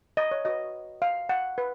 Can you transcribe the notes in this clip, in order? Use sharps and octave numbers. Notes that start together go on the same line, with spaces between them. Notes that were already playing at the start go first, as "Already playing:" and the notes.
D#5
C#5
F#4 B4 D#5
F5
F#5
B4